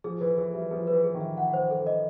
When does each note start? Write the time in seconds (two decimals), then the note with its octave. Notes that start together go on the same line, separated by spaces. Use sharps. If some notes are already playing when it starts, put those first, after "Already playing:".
0.04 F3 G#4
0.21 E3 B4
0.38 E3 G#4
0.54 G3 E5
0.71 F3 G#4
0.87 B4
0.93 E3
1.04 G#4
1.14 D#3
1.21 E5
1.37 F#5
1.54 C5
1.71 A4
1.87 D#5